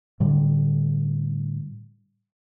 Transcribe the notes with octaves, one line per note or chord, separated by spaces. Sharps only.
A2 D3 G3